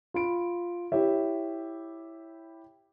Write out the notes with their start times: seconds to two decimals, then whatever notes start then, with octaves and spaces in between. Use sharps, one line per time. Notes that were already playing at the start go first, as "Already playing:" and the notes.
0.14 F4 B5 D7
0.92 E4 G4 C#5 E5